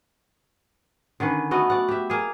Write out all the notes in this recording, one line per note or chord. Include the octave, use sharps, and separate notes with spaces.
D3 D#3 C#4 B4
A3 B3 F#4 D#5
D5 F#5
G4 E5
A#3 G#4